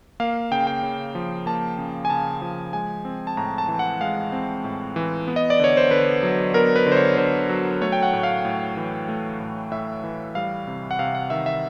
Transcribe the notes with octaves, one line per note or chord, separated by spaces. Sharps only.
A#3 F5
C#3 G5
G5
C#3
F3
A#3 A5
C#3
G#5
C#3 A5
F3
G#3 G#5
C4
A5
A2 A#5
A5
E3
F#5
G#3 F5
C4
A2
E3
B3
D#5
D5
D3 C#5
C5
D3 B4
F#3
B3 A#4
B4
D3
C5
C#5
D3 C5
F#3
A3 C#5
G5
F#5
A2
F5
A2
E3
A3
A2
A2 E5
E3
G3 F5
C3
F#5
C3 F5
F#5
D#3 E5
E5